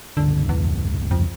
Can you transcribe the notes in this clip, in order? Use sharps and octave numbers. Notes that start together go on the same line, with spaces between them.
F1 C#2 G2 D3
E2
F2